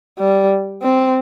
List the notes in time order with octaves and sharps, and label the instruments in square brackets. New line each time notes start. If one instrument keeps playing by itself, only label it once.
[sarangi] G3
C4